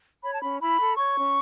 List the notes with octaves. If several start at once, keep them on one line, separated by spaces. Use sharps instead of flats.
C#5 B5
A5
C#4 B5
E4 B5
A4
C#5 C#6
C#4